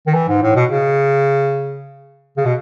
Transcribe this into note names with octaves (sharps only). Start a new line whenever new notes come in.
D#3
E3
G#2
A2
B2
C#3
C#3
B2